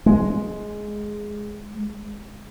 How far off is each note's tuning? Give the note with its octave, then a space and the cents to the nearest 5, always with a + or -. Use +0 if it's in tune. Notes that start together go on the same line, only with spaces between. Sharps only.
G#3 +5